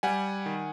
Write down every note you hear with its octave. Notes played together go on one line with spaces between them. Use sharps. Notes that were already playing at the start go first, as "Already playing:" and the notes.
G3 F#5 G#5
D#3